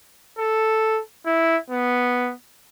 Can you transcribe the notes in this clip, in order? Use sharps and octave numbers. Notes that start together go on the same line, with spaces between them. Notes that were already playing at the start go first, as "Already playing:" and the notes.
A4
E4
B3